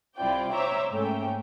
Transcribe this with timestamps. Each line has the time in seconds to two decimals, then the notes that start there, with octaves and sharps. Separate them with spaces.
0.17 C2 C4 E4 F4 D5 G5
0.53 C5 C#5 E5 A#5 D6 E6
0.92 G#2 A3 A#3 C#4 G5